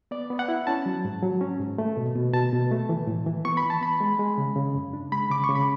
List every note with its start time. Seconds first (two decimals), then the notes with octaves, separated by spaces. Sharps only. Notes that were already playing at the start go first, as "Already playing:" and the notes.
0.11 B3 D5
0.30 B3
0.39 F#5
0.48 E4
0.67 C#4 A5
0.86 F#3
1.05 G#2
1.22 F#3
1.41 C#4
1.60 G#2
1.78 A3
1.97 B2
2.15 B2
2.34 B2 A5
2.52 B2
2.71 A3
2.89 E3
3.07 A2
3.26 E3
3.45 B3 C#6
3.57 B5
3.63 E3
3.70 A5
3.81 B3 B5
4.00 G#3
4.19 G#3
4.38 C#3
4.56 C#3
4.75 F#2
4.93 D4
5.12 G#3 B5
5.30 C#3 D6
5.44 C#6
5.49 C#3
5.55 B5